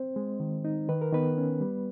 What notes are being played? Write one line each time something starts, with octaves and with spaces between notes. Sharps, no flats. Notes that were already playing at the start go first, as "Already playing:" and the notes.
Already playing: C4 C5
G#3
D#3
D#4
D#3 B4
A#4
D#3 B3 B4
C#4
G3